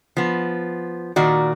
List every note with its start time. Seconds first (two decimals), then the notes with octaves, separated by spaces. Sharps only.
0.17 F3 B3
1.16 A#2 D#3 F#4 D5